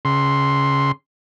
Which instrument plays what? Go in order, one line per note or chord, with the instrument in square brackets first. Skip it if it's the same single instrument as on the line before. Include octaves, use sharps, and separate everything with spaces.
[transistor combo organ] C#3 C6